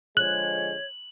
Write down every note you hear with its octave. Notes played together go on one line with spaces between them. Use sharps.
D3 F3 G#3 C#5 F#6 F#7